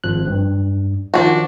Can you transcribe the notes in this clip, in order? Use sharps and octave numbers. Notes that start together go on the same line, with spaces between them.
G#1 F3 F#6
G2
D#3 F3 D4 F4 F#4